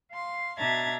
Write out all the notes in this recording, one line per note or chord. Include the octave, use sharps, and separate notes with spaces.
F5 C6
B2 D4 E5 A#5 G#6 A6